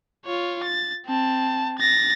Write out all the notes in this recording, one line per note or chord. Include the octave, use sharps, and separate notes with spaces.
F4 C#5
A6
C4 A5
A6 A#6